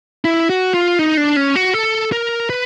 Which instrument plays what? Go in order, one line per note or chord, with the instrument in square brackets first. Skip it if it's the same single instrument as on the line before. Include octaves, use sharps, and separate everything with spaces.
[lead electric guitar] E4
F#4
F4
D#4
D4
C#4
F#4
A4
A#4
B4